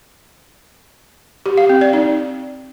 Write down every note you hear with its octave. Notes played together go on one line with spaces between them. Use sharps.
G4
F5
C4
D5
D#4